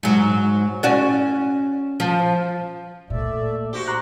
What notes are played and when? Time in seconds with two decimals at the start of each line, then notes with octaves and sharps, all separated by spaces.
0.03 G#2 F#3
0.83 C#4 F#4 D5
2.00 F3
3.10 A#2 A3 D5 E5
3.73 F#4 G4 C5
3.88 A#5 C6 F#6